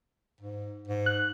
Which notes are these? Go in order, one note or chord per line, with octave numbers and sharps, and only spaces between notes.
G#2
G#2
F#6